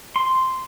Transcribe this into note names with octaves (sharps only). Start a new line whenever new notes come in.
C6